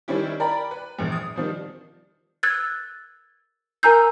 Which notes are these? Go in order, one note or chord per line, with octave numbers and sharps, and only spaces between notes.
D#3 G3 C4 C#4 E4 G4
A#4 D5 G5 A#5 B5
B4
A#1 E2
D#6
D#3 F3 G3
E6 F#6 G#6 A6
A#4 G#5 A#5 E6 G6